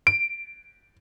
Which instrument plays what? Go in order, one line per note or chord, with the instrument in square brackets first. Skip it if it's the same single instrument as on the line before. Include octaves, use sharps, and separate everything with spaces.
[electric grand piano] D7